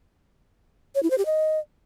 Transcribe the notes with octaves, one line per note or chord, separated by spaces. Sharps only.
C#5
E4
C5
G4
D#5